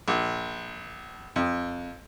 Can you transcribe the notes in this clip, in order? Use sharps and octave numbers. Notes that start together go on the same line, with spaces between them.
A#1
F2